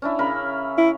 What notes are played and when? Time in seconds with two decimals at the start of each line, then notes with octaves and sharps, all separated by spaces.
0.02 C#4 D4 E4
0.19 C#3 A#4 B5
0.78 E4